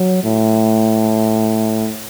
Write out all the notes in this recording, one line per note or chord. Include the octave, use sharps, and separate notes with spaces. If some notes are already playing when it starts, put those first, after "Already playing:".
Already playing: F#3
A2